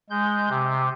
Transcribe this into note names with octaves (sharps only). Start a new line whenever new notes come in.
G#3 G6
C3